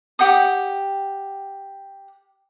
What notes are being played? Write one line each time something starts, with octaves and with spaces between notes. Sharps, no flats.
G4 F#5 G5 D#6